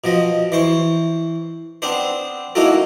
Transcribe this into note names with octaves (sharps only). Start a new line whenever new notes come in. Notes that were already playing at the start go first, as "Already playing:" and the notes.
B2 F3 D#5
E3 C5 C#6
B3 C4 D4 C5
A#3 C#4 D#4 E4 F#4 A4